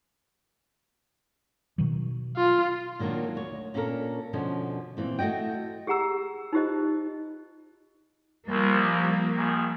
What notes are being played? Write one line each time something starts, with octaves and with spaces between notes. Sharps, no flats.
B2 D#3 F#3
F4
A#2 D#3 F#3 A#3 D4
D2 C#5
A#2 C#4 D4 E4 A4 A#4
B2 D3 F3 C#4
A#2 E3 C4
A3 E4 F#4 D#5 G5
G4 G#4 F#5 A#5 E6
D#4 F4 G4 C5 D#5
C2 F3 G3 A#3
A#1 D#3 G#4